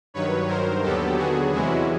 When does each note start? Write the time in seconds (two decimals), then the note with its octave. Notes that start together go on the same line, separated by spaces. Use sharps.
0.14 G2 D#3 F#3 B4 C#5
0.48 A#4 C5
0.83 D#2 D3 F#3 B3 G4 A4
1.18 F#4 G#4
1.52 E2 C3 E3 G#3 C#4 E4 F#4